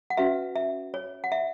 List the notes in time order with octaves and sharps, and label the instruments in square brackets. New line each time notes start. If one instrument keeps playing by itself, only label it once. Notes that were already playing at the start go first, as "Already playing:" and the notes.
[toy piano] F#5
C#4 F#4 B4 E5
E5
C#5
F#5
E5